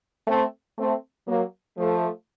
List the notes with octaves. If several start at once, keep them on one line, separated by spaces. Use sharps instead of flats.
A3 C4
A3 C4
F#3 A#3
F3 A3